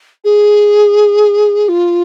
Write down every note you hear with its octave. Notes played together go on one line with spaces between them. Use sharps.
G#4
F4